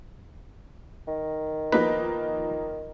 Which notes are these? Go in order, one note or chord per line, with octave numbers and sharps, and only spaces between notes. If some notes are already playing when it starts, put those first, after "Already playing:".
D#3
F3 A#3 D#4 B4